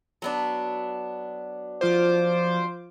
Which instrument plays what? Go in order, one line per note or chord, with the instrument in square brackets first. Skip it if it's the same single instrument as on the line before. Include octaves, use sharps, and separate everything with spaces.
[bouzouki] F#3 B3 D4
[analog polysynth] F3 F4 D6 [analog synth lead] C5